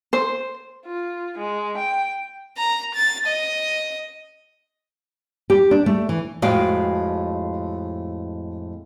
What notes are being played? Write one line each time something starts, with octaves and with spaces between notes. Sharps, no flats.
C5
F4
G#3
G5
A#5
A6
D#5
G4
D4
A3
E3
F2 A2 G#3 F#4 F5 G5